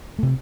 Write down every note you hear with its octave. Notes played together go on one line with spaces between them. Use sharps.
C3 A3